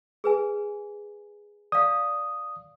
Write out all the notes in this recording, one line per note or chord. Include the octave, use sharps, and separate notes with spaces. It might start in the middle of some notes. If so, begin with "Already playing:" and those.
G#4 B4 G#5
D5 F5 D#6